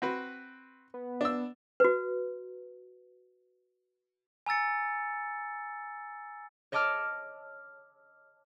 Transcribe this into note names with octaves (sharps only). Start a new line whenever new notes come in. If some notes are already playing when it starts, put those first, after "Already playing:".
C4 F#4 B4
B3
D4 E6
F#4 B4
G#5 A#5 E6 A6 C#7
C#5 D#5 A5 D6 E6 F6